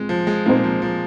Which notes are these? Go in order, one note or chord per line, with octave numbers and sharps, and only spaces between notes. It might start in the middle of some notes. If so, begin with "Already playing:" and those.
Already playing: G#3 C4 F4
F3
G#3
A#2 G#3 A#3 C4 D#4 C5
F3
F3